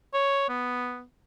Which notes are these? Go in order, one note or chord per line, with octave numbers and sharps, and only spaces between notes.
C#5
B3